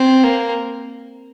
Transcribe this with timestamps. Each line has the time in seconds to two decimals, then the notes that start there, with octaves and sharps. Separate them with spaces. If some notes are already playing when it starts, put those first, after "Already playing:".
Already playing: C4
0.24 A#3